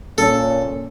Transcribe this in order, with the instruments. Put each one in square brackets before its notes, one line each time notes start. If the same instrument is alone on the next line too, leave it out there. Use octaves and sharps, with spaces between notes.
[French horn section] A#2 C#4 [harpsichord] A4